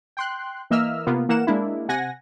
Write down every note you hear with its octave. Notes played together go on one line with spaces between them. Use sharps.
G5 C6 F#6
E3 A#3 D#5 E5 E6 F6
C3 A#3 B3 F4
E3 A#3 A#4 F#5 E7
G#3 A#3 D4 E4
C3 F#5 G#5 A#6